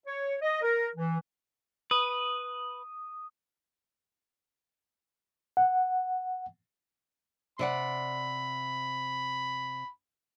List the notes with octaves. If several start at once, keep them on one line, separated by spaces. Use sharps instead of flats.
C#5
D#5
A#4
E3
B4 D#6
F#5
C3 D5 F#5 B5